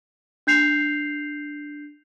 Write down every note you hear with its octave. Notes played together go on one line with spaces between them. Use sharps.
D4 G6 C7 F7